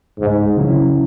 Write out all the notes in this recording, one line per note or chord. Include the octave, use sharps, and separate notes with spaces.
C#2 G#2
C#3 F#3 C#4 E4